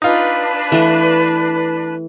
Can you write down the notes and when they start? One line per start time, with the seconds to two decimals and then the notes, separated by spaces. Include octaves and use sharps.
0.02 D4 D#4 F4 B4
0.72 E3 A3